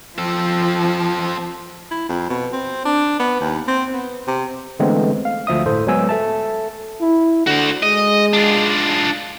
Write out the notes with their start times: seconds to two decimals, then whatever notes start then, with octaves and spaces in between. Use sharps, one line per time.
0.19 F3 C4 A4
1.91 E4
2.09 F2
2.30 B2
2.53 C4
2.85 D4
3.19 B3
3.41 D#2
3.68 C4
3.94 B3
4.27 C3
4.79 D3 E3 G#3 A3 B3 C4
5.25 F5
5.47 D2 F3 E5 D#6
5.66 G1 A2 A4 C5
5.87 F#3 G#3 B3 G#5 E6
6.09 A4 E5 A5
7.01 E4
7.46 D3 F#4 C5
7.83 G#3 D#5
8.33 D4 F4